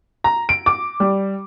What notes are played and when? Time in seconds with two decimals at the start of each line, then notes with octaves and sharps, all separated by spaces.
0.24 A#5
0.49 D7
0.66 D6
1.00 G3